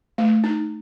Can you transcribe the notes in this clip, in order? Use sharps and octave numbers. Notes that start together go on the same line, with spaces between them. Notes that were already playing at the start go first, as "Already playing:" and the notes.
A3
D#4